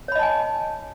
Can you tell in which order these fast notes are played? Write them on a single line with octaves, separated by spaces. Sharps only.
C#5 B5 D#5 A5 G#5